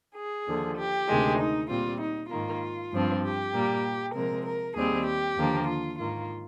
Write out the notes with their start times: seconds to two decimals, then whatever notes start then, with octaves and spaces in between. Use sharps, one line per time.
0.17 G#4
0.48 D#2 D3 F3
0.78 G4
1.09 D2 C3 D#3 G#3
1.39 D#4
1.70 A#2 G3 C4 F4
2.01 D#4
2.31 G#2 D#3 A#3 F4
2.93 G2 F3 C4
3.24 G4
3.54 A#2 G3 A#3
4.15 C3 F3 G#3 C4 A#4
4.46 A#4
4.76 D#2 D#3 G3 C4 G#4
5.07 G4
5.38 D#2 D3 F3 A#3
5.69 F4
6.00 G#2 D#3 A#3 F4